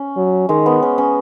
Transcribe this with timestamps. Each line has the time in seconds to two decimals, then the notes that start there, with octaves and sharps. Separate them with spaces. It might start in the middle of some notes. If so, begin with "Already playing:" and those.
Already playing: C#4
0.17 F#3
0.49 D#3 G#3
0.66 B3
0.82 C#4
0.98 C#4